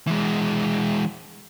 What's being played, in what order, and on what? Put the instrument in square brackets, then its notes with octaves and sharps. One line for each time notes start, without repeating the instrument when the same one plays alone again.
[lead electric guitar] E3 G#3